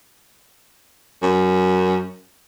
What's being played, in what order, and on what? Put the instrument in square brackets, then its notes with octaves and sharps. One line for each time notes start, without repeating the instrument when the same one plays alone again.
[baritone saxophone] F#2